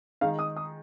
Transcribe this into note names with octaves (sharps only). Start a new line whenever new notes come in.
D#3 G#3 D#4 F5
D#6
D#6